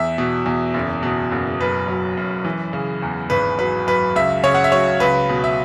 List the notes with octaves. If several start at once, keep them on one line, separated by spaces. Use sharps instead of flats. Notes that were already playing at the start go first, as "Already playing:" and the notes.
Already playing: E2 E5
B2
E2
F#1
B2
F#1
F#2 B4
F#3
F#2
E3
C#3
E2
G#1 B4
F#3 B4
F#2 B4
C#2 E5
C#3 C#5
F#5
E5
F#3 C#5
C#2 B4
B2
E5